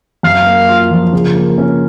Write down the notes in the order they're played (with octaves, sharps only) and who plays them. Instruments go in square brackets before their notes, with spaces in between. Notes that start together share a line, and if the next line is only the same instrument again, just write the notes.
[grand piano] F#2 [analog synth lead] F5
[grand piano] A#3
F4
F3
C#3
A#3
C#4